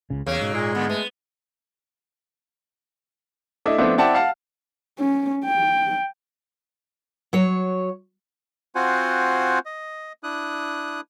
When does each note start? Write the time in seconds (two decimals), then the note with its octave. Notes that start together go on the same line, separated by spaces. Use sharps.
0.10 C#2 C#3
0.27 E2 C#3 F#3 A#3
0.41 G#2 B2
0.53 A#2 G#3
0.75 A#2 D3 B3
0.89 A3 B3
3.65 A3 D4 E4 D#5
3.78 F3 A3 B3 C4 D4 E4
3.98 C4 E4 D5 F#5 G5 A5
4.14 F5 F#5 A5 F6
4.99 C#4
5.45 G5
7.33 F#3 C#5
8.75 C4 F4 F#4 C5 F#5 G#5
9.65 D#5
10.23 D4 E4 D#6 F#6